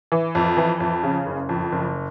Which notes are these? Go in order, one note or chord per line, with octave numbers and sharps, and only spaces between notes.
E3
F2
E3
F2
C#3
F#1
F2
F#1